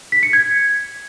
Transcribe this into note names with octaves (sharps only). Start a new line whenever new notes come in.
B6
C#7
G#6